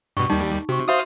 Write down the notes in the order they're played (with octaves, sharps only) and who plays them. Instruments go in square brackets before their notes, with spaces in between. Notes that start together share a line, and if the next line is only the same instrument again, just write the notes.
[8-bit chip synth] G2 B2 [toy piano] C#6
[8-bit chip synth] D#2 G3 [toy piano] D#4
[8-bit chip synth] C3 [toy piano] F#4 C#6
[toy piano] F#4 E5 C6 [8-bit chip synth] C5 F5 D#6